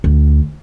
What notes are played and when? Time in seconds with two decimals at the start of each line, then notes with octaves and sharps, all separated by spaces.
0.04 D2